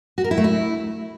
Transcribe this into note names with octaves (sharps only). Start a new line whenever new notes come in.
F#4
A#4
E4
A3
E4